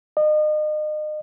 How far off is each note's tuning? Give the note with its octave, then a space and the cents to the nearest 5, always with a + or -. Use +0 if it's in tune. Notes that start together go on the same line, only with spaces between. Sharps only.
D#5 -35